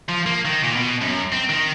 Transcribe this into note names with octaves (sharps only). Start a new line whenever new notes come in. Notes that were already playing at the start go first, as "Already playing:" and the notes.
F3
A#3
D#3
A#2
B2
F#2
C4
D#3